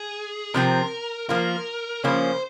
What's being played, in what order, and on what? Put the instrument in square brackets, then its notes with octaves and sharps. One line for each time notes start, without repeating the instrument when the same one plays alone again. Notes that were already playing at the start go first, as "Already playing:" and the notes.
Already playing: [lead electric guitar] G#4
[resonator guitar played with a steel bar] C3 F3 C4 [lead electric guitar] A#4
[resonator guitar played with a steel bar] F3 A#3 F4 [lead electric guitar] A#4
[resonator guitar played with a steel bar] C#3 F3 A#3 C#4 [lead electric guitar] C5